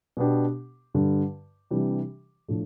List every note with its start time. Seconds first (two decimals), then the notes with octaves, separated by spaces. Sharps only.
0.17 B2 B3 D4 G4
0.94 G2 D3 G3
1.71 C3 E3 G3 D4 G4
2.48 A2 F3 A3 D4